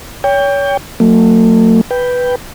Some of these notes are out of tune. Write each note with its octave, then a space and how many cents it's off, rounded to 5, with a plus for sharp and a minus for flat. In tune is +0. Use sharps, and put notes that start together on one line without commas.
C#5 +30 G5 +20
F#3 -30 A3 +40
B4 +0 G5 +0